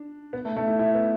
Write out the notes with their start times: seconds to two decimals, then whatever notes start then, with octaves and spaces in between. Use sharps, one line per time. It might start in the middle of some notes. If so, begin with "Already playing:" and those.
Already playing: D4
0.33 B3
0.45 A3
0.56 A3
0.68 E4
0.79 E4
0.94 B3